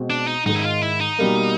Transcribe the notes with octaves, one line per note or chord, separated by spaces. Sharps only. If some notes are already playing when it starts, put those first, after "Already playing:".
Already playing: B2 G#3 C4
D4
D#4
G#2 D#3 G#3 D#4
E4
F4
E4
D#4
B2 G3 A#3